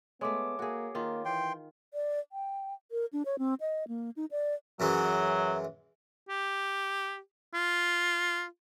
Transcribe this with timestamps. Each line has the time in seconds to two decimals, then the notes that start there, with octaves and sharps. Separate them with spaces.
0.21 G#3 A3 B3 C#5 D6
0.59 A#3 F#4 G#4
0.95 D#3 A#3 F4
1.25 E3 G5 C6
1.94 D5
2.32 G5
2.91 A#4
3.13 D4
3.25 C#5
3.39 C4
3.60 D#5
3.88 A#3
4.16 D#4
4.31 D5
4.80 F#2 E3 F#3 G#3
6.29 G4
7.54 F4